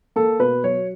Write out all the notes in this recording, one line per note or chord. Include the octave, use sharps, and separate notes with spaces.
A#3 A4
B2 B4
F#3 C#5